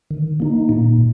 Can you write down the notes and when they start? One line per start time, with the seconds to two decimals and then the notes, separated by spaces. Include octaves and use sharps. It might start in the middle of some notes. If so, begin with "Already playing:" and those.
0.11 D#3
0.40 A#3 D#4
0.69 A#2